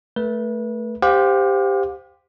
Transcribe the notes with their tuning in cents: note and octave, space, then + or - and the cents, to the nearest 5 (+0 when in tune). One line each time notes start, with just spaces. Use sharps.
A3 +0 B4 -30
G4 +10 C5 -10 F5 +40